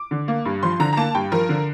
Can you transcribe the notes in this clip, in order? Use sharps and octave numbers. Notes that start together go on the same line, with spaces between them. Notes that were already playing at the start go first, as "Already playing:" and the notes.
Already playing: D6
D3
A#3
G2
F3 C6
D3 A#5
A#5
A#3 A5
G2 G5
F3 A#4
D3